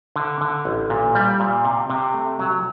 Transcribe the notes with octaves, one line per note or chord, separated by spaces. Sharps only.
D3
D3
A1
A#2
G3
A#2
C3
C3
A3
F#3